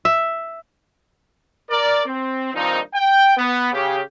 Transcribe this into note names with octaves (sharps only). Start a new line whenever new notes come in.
E5
A#4 D5
C4
G2 A#2 D#3 F3 C4 D#4
G5
B3
C#3 G4